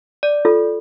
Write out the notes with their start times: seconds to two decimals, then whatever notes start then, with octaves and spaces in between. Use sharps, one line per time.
0.23 D5
0.45 F4 A4